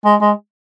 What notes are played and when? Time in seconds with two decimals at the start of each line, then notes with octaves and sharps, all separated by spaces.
0.05 G#3
0.21 G#3